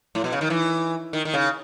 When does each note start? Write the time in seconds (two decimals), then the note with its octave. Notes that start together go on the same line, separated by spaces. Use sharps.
0.15 A2
0.24 B2
0.32 C#3
0.41 D#3
0.50 E3
1.13 D#3
1.25 D#3
1.34 C#3